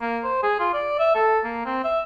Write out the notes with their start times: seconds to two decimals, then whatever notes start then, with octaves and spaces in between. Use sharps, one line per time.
0.01 A#3
0.24 C5
0.43 G#4
0.60 F4
0.74 D5
0.99 E5
1.15 A4
1.44 A#3
1.66 C4
1.84 E5